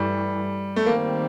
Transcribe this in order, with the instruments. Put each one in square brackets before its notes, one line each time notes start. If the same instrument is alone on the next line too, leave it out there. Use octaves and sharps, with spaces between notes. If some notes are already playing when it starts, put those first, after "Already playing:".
Already playing: [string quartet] G2 E3 A3 [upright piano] G3
[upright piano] A3
[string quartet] D#3 G3 C4 [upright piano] A#3